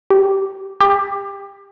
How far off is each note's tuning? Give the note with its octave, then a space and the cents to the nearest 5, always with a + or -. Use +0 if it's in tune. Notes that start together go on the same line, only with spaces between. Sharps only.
G4 -10
G4 +25